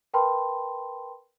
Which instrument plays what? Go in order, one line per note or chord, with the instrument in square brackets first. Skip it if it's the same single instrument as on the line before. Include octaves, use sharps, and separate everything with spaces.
[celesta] A#4 B4 G5 A5 B5 C6